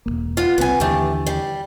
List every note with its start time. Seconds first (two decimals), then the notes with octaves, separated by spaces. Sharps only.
0.06 E1 D#2 A#3
0.37 B3 F4
0.58 C2 B3 C4 G#5
0.80 D#2 D3 E3 A3 G4
1.27 G3